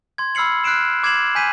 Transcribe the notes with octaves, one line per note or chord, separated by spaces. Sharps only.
C6 G#6
B5 E6 F6 C7 C#7 F#7
F6 F#6 C7 D7 E7
D6 G#6 C7 E7 F#7
G#5 G6 B6 D#7